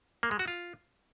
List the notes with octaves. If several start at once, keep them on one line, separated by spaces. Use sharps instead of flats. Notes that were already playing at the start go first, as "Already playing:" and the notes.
A#3
G#3
F#4
F4